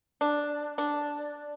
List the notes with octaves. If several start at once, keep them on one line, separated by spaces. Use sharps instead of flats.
D4
D4